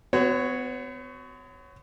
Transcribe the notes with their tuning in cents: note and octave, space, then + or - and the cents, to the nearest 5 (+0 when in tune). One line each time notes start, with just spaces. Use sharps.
B3 +45 F#4 +0 C#5 +0